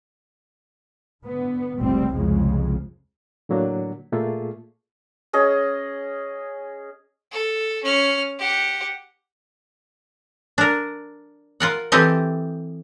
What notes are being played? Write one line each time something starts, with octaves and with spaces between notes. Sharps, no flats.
D3 B3
F1 C#2 G3 C4
C2 F2 C#3 G#3
A2 D3 F#3 A#3 D4
A#2 A3 A#3 F4 G#4
C#4 G#4 D#5
A4
C#4 F6
G4 F#5
D4 A#4
F4 A#4 F#5
E3 C4 G4 A4 D#5